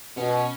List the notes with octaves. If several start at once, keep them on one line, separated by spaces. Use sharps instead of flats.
B2 C#4